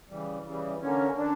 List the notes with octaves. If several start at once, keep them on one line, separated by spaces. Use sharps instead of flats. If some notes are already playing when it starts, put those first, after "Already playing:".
C#3 E3 G3
C#3 E3 G3
D3 A#3 C#4
D3 D4